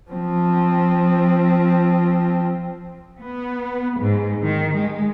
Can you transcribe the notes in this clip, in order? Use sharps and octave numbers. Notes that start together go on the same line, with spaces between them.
F3 C4
B3
G#2
D#3
G#3